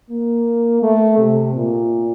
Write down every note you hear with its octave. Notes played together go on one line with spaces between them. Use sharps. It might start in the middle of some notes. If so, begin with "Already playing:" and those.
A#3
A3
C3
A#2